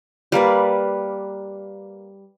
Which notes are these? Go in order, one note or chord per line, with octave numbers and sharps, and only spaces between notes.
G3 A#3 B4 D5